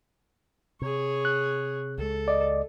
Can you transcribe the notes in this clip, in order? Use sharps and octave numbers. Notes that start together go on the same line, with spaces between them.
C3 G#4 C#5
F#6
C#2 G#3 A4
D5 D#5